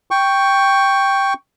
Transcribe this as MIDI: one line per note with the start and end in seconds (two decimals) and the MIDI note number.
0.11 1.34 79
0.11 1.34 85